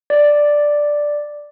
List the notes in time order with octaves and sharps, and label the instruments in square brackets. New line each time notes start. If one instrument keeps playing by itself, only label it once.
[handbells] D5